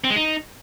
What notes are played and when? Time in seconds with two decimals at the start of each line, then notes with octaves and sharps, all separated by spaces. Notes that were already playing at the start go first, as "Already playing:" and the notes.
0.04 C4
0.10 G#3
0.16 D#4